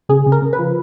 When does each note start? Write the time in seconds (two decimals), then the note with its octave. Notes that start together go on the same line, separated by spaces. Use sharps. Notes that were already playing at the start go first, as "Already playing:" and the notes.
0.09 C#3 G#4
0.26 C#3
0.32 A#4
0.42 C#3
0.53 B4
0.59 F3